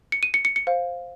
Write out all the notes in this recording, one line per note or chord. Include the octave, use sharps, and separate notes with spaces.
C#7
D#7
C#7
C#7
C#7
C5 F5